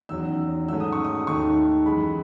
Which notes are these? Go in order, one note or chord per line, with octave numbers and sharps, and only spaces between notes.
E2 D#3 F#3 C#4 E6
G#2 D#3 F#3 A3 C#4 E6
D#6
C#6
D#6
D#2 D#3 A3 D#4 C#6
F#2 E3 G#3 B5